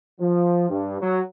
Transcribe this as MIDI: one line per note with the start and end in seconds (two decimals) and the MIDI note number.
0.20 0.67 53
0.69 0.96 43
1.01 1.20 54